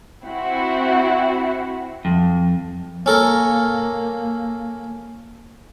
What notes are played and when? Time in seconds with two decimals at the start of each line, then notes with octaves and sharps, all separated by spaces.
0.25 C4 E4 F#4
2.05 F2
3.06 A#3 C#4 A4 A#4